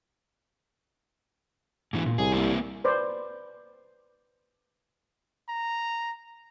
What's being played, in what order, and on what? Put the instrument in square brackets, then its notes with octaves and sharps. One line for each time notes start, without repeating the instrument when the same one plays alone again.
[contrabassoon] E1 [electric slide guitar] G#2 E3
[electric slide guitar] A#2
[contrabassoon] C2 [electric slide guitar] G#4
[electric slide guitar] A#3 C4 E4
[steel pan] B4 C5 D5
[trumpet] A#5